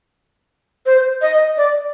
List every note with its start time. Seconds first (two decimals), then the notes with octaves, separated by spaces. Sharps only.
0.86 C5
1.22 D#5
1.58 D5